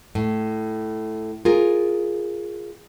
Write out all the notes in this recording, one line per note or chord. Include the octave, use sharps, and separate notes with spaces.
A2
F4 G#4 A#4